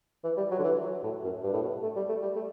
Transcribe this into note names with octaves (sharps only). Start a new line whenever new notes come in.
E3
G3
F#3
D3
E3
F#3
A2
F#2
G2
A2
B2
A3
G3
A3
G3
A3